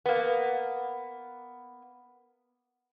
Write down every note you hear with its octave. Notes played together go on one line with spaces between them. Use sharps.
A#3 B3